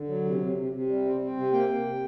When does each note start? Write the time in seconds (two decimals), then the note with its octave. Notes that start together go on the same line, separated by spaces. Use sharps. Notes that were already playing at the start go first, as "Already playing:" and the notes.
Already playing: D3
0.09 F#3
0.25 C3
0.41 C3
0.57 C3
0.72 C3
0.89 G3
1.05 C4
1.21 C4
1.37 C3
1.52 A#3 G5
1.69 A#3
1.85 C3